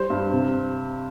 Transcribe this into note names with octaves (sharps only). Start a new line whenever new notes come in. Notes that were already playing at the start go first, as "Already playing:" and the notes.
Already playing: G3 C5
G2
C3